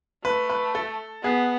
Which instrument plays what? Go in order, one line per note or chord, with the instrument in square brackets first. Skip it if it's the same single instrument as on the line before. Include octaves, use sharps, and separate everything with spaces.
[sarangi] A3 [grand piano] B4
[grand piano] B4
A4
[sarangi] B3 [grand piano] G#4